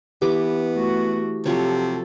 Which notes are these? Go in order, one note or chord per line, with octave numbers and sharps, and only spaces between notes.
E3 B3 G4 D6
A3 F#4
C3 F3 F#3 A4 C#5